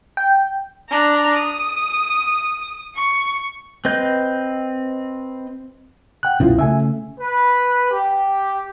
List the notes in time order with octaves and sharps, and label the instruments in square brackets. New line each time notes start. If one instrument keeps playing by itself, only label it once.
[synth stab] G5
[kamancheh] D4 A#5
D#6
C#6
[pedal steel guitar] C4 B4 D#5 G6
[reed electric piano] F#5 G5 F#6
[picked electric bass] C2 F#2 B2 [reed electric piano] C#4 E4 F4
[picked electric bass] C#3 A3 [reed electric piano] E5 G#5
[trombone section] B4
G4